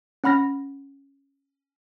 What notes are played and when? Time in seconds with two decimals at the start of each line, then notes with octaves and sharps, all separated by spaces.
0.24 C#4 F#5 B5 F6 A#6